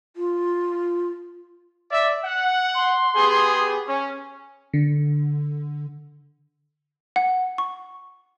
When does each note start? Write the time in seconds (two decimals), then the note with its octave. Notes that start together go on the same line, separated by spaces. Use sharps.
0.16 F4
1.91 D5 E5
2.23 F#5
2.75 C6
3.15 B3 G4 G#4
3.87 C#4
4.74 D3
7.16 F#5
7.58 C#6